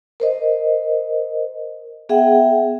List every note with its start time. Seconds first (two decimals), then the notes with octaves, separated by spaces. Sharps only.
0.20 A#4 C5 D#5
2.09 B3 G#4 E5 F#5 G5